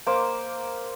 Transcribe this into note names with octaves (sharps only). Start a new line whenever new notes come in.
A#3 C5 D6